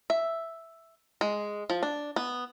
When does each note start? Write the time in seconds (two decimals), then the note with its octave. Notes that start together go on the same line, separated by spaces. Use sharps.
0.10 E5
1.21 G#3
1.70 F3
1.83 D4
2.16 B3